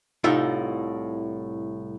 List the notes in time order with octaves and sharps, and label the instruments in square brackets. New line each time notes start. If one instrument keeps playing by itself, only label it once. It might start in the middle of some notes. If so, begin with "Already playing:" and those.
[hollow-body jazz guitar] C2 A2 D#4 F4 A4 E5